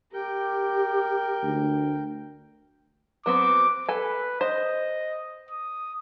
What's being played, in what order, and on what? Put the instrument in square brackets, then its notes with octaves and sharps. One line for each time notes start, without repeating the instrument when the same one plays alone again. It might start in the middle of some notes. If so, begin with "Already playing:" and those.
[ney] G4 [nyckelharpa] A#4 G5
[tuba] D2
[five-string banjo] F#3 B3 C4 [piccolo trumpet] D6
[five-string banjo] A4 G#5 [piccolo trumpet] B4
[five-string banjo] C5 [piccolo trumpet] D#5
[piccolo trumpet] D#6